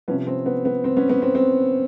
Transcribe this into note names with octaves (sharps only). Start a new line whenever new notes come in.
C3 F3 B3 C#4
C4
B3
B3
C4
B3 C#4
B3 C#4
C4
C4